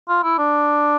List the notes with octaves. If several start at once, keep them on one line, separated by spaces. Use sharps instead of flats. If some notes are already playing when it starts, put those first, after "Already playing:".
F4
E4
D4